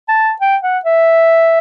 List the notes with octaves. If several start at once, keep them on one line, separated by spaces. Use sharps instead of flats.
A5
G5
F#5
E5